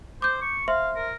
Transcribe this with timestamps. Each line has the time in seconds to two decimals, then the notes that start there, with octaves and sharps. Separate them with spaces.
0.22 C5 D6 G6
0.42 C#6
0.68 C5 E5 F5 C6
0.96 A#4